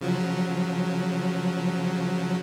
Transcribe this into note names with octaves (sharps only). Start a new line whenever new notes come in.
C#3 F3 F#3